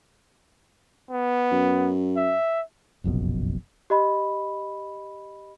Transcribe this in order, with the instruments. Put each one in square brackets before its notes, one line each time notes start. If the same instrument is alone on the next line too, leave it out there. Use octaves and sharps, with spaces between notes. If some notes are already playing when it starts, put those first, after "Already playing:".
[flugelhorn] B3
[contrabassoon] F#2
[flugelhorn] E5
[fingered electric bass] F1 A#1 F#2 B2
[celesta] G4 D#5 B5